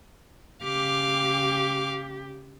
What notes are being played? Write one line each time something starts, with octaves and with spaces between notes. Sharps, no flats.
C#3 G4 F5 D6